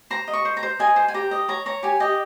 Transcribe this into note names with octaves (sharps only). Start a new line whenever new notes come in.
C5 A#5
D#5
C#6
C5
A#5
C5
D#5 G#5
C5
G#5
G4 A#5
D#5
C#5 A#5
C#5 A#5
G4 G#5
G4 D#5